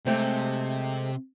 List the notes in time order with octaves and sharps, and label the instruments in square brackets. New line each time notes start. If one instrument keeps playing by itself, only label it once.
[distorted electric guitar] C3 [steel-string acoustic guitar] G#3 A3 C4